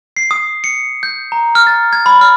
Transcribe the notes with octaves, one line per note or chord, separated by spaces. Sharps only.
C7
D#6
C#7
G6
A#5
F6
A6
G#6
B5
F6